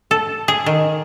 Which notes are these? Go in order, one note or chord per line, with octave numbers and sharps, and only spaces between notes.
A4
G#4
D#3